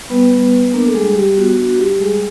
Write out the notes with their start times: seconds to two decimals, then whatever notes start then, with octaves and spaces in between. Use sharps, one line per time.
0.10 G3 B3 B4
0.32 G3
0.52 B3
0.73 A#3 D4 A#4
0.87 A4
0.94 G3 G#3 G#4
1.15 G3 G4
1.37 B3 F#4
1.58 D4 F#4
1.78 G3 G4
2.00 G3 G#3 G#4